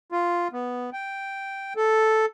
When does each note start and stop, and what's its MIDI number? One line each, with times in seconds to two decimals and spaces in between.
0.12 0.48 65
0.53 0.90 59
0.93 1.73 79
1.76 2.26 69